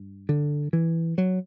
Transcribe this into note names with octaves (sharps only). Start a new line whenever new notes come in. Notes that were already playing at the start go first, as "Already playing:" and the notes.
Already playing: G2
D3
E3
F#3